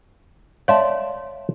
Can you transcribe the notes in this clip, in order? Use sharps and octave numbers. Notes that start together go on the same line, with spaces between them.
C#5 D5 E5 F5 A5 C6